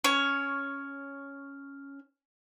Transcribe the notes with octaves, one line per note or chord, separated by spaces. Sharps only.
C#4 C#5